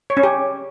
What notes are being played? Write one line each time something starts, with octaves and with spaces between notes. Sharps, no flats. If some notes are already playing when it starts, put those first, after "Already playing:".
C#5
C#4
G4